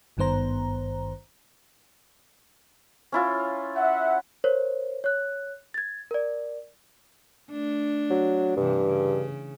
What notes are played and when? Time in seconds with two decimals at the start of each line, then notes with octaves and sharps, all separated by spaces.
0.17 G#1 G2 D#3 B3 C5 A#5
3.12 C#4 E4 F4
3.76 E5 F#5
4.44 A#4 C5 C#5
5.04 C#5 F#6
5.74 G#6 A6
6.11 A#4 D5
7.51 A3 D4
8.11 F#3
8.56 G2 C3 E3
8.86 C#3